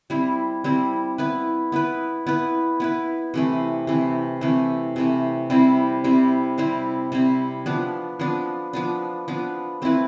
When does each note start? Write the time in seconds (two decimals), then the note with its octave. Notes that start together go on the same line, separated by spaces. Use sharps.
0.10 G3 C4 E4
0.64 G3 C4 E4
1.18 B3 E4 B4
1.72 B3 E4 B4
2.27 B3 E4 B4
2.80 B3 E4 B4
3.34 C3 E3 A3
3.87 C3 E3 A3
4.41 C3 E3 A3
4.96 C3 E3 A3
5.50 C3 G3 C4 E4
6.04 C3 G3 C4 E4
6.58 C3 G3 C4 E4
7.12 C3 G3 C4 E4
7.66 F3 B3 D4
8.19 F3 B3 D4
8.73 F3 B3 D4
9.28 F3 B3 D4
9.82 A3 C4 E4 B4